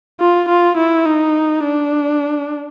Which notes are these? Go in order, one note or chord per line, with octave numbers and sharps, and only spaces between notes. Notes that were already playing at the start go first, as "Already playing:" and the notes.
F4
F4
E4
D#4
D4